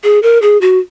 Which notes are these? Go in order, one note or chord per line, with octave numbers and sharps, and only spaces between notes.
G#4
A#4
G#4
F#4